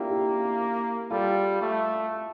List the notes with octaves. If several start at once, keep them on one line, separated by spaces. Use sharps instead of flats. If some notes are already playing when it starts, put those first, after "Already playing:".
Already playing: A#3 D4 E4 F4 G4
E4 G4
G3 F4 A4
A3